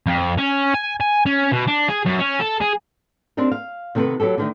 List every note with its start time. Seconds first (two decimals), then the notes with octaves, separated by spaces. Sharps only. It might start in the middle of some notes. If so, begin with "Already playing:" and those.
0.06 F2
0.38 C#4
0.74 G#5
1.01 G#5
1.26 C#4
1.52 B2
1.67 D4
1.88 G#4
2.05 F#2
2.19 C#4
2.40 A4
2.60 G#4
3.37 C4 D4 D#4 G4 A#4
3.52 F5
3.95 C3 D#3 B3 G#4 A4 B4
4.20 F#3 B3 G4 A4
4.38 D3 D#3 A3